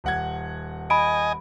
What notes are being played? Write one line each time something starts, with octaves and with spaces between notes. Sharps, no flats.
D#1 F#5 G#6
D#5 G#5 B5 D7